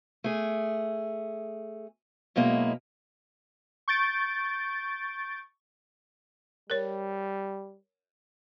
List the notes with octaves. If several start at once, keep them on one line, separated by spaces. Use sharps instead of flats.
A3 G#4
F#2 B2 G#3 A#3 E4
C#6 G6 A6 D7
G3 A#4 C#5